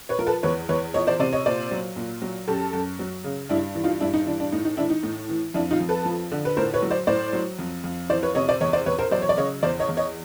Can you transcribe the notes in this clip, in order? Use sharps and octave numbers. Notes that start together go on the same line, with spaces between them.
B4 C#5
F3 A#4
A4 B4
E2 B4 C#5
E2 B4 C#5
F3 C#5 D#5
C5 D5
C3 C5 D5
C#5 D#5
A#2 C5 D5
F#3
A#2
F#3
F#2 G4 A4
F#2
F#3
C#3
G2 D4 E4
E3
D#4 F4
G2 D4 E4
D#4
E3 D4
D4
A2 D#4
D#4
E3 D4 E4
D#4
A2
E3
F2 D4 E4
D#4 F4
F2
A4 B4
F3
D3
B4
A2 A#4 C5
B4 C#5
F#3
C5 D5
A2 C5 D5
F#3
F2
F2
E3 C5 D5
B4 C#5
C3 C#5 D#5
C5 D5
E2 C#5 D#5
C5 D5
E2 B4 C#5
A#4 C5
F#3 C5 D5
C#5
D5
C#3 C#5 D#5
E2 C5 D5
C#5 D#5
E2
C#5 D#5